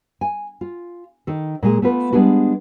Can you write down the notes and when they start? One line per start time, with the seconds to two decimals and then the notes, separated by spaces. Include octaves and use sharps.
0.21 G#5
0.61 F4
1.27 D#3 A4
1.63 A#2 G#3 G#4
1.82 A3 B3 F4 B4
2.12 G3 G#3 B3 D4 F#4